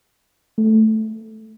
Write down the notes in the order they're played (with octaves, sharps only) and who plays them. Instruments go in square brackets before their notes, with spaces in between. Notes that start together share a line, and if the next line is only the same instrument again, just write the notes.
[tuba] A3